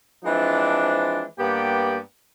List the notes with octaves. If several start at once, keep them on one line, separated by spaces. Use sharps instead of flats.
E3 F3 G#3 C4 D4
G2 A#3 B3 G4 D5 G5